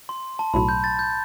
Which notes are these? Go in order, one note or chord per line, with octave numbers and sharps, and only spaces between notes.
C6
A5
B1 A2 F#3 B5
G6
A6
G6